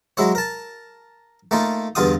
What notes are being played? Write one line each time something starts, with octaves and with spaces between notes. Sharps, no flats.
F#3 G#3 E4 C#5
A#4 A5
A3 A#3 D#4 F4
E2 G2 D3 F4 F5 D#6